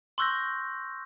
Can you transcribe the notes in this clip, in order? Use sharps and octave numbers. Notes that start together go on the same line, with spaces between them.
C6 C#6 E6 F#6 G6 A#6